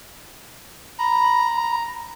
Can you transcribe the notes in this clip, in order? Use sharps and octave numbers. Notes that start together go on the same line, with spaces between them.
A#5 B5